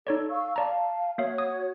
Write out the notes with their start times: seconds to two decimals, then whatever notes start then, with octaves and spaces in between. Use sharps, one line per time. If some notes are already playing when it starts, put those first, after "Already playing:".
0.07 D#4 A4 C#5 D5
0.30 F5 C#6 E6
0.56 D5 F5 A5 A#5
1.18 A#3 F#4 C#5 E5 F5
1.38 D#6